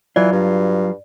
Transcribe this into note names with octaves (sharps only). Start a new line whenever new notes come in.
E3 F#3 F4 D5
G2